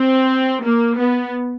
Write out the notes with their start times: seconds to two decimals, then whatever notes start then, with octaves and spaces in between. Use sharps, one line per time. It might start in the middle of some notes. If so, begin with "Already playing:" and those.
Already playing: C4
0.62 A#3
0.97 B3